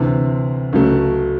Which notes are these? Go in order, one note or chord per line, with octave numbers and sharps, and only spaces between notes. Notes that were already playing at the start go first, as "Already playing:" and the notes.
Already playing: D2 C3 E3
C#2 C#3 F#3 A3